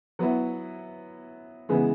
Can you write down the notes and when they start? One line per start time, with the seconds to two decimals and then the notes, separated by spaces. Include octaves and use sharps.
0.19 F#3 B3 E4
1.69 C#3 E3 G#3 B3